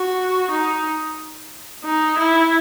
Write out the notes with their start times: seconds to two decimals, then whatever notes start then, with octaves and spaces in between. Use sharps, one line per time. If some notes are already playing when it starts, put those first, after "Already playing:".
Already playing: F#4
0.51 D#4
1.85 D#4
2.18 E4